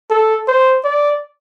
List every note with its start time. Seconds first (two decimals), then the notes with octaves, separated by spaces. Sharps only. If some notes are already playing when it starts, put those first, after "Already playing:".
0.11 A4
0.48 C5
0.85 D5